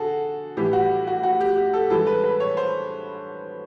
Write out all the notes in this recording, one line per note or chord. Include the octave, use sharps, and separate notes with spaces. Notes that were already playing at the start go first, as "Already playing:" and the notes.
Already playing: D3 F#4 G#4 A4
A2 E3 G3 G4
F#4
F#4
F#4
G4
G4
A4
G2 E3 G#3 A4
B4
B4
C#5
C5